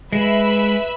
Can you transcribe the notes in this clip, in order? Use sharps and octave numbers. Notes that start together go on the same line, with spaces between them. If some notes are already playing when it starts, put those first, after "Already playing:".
G#3 B4 E5 B5